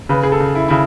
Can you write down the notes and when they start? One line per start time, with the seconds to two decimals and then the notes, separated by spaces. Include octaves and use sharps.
0.09 C#3 B4
0.23 G#4
0.32 A4
0.40 C#3
0.55 E4
0.68 C#3 E4